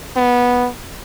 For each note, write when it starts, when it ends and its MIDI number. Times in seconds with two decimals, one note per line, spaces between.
0.16 0.69 59